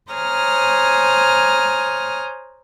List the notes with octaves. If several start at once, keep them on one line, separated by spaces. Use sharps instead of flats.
C5 C#5 G#5 A#5 D#6 F6